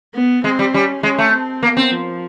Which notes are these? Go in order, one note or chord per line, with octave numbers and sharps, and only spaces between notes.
B3
G#3 C4
G3
G3 C#4
G#3 C#4
A3
C4
A#3 B3
C4
F3